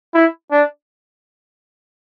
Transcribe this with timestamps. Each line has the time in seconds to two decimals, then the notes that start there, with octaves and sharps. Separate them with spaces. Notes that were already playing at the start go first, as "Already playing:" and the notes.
0.14 E4
0.52 D4